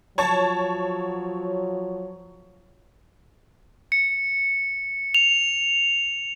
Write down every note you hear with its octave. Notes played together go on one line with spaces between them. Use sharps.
F3 F#3 C#5 A5
C#7
F7